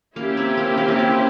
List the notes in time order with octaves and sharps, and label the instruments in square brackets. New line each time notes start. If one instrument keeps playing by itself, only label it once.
[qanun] A#3 [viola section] C#4 E4 G4
[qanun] C4
A#3
A#3
C4
A#3